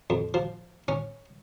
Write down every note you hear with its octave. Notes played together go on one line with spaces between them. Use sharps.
F2
F3
C#4